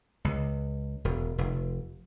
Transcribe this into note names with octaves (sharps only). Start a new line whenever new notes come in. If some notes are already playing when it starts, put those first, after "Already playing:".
C#2
E1
F1